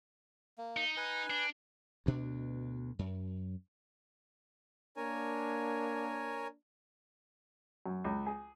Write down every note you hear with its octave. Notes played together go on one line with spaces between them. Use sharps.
A#3
D#4
B4 G#5
D4
D2 B2 D4
F#2
A#3 D4 A#4 C#5 G#5
F#2
C#2
G#4